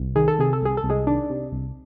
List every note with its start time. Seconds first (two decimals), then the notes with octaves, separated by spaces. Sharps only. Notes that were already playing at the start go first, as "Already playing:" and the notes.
Already playing: C2
0.16 D#3 G#4
0.28 A4
0.39 C3 G#4
0.53 A4
0.62 C2 G#4
0.77 A4
0.84 C2
0.90 G#3 G#4
1.07 D#3 D4
1.30 C3
1.52 C2